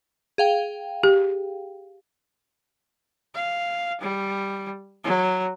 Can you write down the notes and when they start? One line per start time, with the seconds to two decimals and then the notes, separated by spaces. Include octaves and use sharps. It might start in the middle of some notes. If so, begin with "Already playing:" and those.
0.38 G#4 F5 G5
1.03 G4
3.34 F5
4.01 G3
5.04 F#3